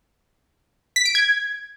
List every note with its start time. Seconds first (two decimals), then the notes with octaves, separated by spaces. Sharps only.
0.96 B6
1.05 D7
1.15 G#6